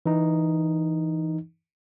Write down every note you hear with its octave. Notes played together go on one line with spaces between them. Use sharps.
E3 D#4